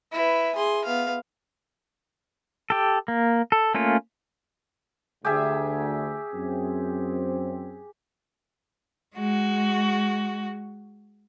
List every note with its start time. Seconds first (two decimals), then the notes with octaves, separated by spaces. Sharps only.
0.13 E4 B4
0.56 G#4 C6
0.85 B3 F5
2.70 G4 A4
3.08 A#3
3.52 A4
3.75 A3 A#3 C#4 F4
5.25 D2 G4 G#4 E5
6.34 F#2 C4
9.15 G#3 F#4